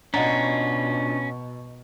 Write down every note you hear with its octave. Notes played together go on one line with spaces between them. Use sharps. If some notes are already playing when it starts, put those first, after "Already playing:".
B2 C#4 D4 F4 D#5 F#5 A#5